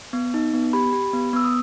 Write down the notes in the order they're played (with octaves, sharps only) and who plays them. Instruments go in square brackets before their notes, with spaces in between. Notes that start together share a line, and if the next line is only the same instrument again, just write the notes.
[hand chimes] B3
D#4
B3
G4 B5
G4
B3
B3 E6
D#6